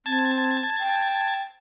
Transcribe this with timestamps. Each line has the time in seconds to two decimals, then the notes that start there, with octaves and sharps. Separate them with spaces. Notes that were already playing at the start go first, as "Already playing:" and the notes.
0.06 C4 A5 G#6 A6
0.80 G5